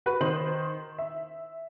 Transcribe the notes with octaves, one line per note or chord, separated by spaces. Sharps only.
F#4 B4
D#3 C5 F#7
E5